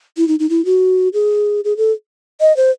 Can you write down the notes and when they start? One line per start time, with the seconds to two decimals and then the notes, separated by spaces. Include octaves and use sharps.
0.17 E4
0.28 D#4
0.39 D#4
0.50 E4
0.65 F#4
1.13 G#4
1.64 G#4
1.77 A4
2.40 D#5
2.57 C5